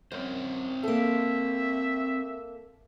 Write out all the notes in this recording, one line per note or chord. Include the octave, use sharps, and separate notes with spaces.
F#2 C4 A#4 C5
A#3 A4 E5